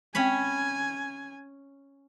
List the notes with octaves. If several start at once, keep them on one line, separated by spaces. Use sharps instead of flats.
G#3 C4 C#4 C#5 G5 G#5 B5